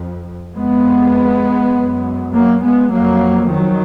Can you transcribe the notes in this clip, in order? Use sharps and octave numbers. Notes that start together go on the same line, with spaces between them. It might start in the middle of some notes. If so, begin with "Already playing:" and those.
Already playing: F2
F2 G#3 B3
F#2
F#3 A#3
G#3 B3
F2 F#3 A#3
D#3 F#3